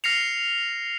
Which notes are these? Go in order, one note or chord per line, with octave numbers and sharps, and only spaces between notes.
F6 A#6 C7 C#7 F7